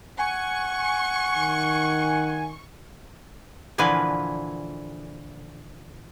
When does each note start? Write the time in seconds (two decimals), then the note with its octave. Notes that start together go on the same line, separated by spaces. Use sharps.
0.19 F#5 G#5 C#6
1.37 D#3
3.78 A#2 D3 E3 F3 B4 G#5